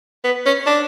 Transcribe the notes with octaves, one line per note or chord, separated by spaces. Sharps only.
B3
C#4
D4